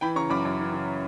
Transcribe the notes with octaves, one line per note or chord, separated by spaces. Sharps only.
E3 G5 B5
C#3 A#5 C#6
F#2 B5 D6
F#2
E3
C#3